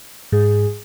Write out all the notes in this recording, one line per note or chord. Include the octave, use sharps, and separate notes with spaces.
G#2 G#4